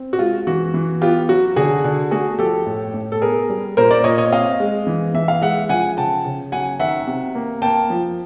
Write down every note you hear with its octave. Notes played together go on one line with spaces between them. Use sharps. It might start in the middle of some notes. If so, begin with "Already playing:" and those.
Already playing: C4
F#4
G#3 F4
E3 F#4
E3
B3 F4 G4
F#3 F#4
D3 F#4 G#4
D3
A3 F#4 G#4
F3 G4 A4
A2
A2
A4
B3 G#4 A#4
G3
A#2 A#4 C5
C5 D5
A#2 C#5 D#5
C#5 D#5
C4 D#5 F5
G#3
E3
E3 E5
F5
G#3 E5 F#5
F3 F#5 G#5
C#3 G5 A5
C#3
F#3 F#5 G#5
D#3 E5 F#5
C3
A#3
A#3 G5 A5
F3